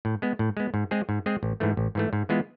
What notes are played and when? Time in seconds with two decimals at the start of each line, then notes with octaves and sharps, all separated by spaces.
0.05 A2
0.22 G#3 B3
0.39 A2
0.57 G#3 B3
0.74 G#2
0.91 G#3 C4 G#4
1.09 G#2
1.26 G#3 C4 G#4
1.43 A1
1.60 G#2 E3 A3
1.77 A1
1.95 G#2 E3 A3
2.13 G#2
2.29 E3 G#3 B3 F4